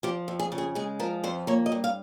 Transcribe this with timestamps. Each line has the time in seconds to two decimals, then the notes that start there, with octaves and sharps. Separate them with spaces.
0.03 F3 G4
0.28 F2
0.39 G#4
0.52 C#3
0.58 G#4
0.75 G#3 G#4
1.00 F3 A#4
1.23 F2 C5
1.47 A#3 C#5
1.66 D#5
1.72 G2
1.84 F5